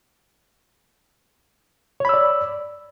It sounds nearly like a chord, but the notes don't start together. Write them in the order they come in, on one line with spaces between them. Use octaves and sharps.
C#5 B5 E6 D5